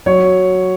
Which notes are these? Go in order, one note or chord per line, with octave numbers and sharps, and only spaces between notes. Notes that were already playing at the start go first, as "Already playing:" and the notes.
F#3 C#5